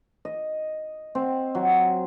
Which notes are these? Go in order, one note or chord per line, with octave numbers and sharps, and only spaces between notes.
D#5
C4
F#3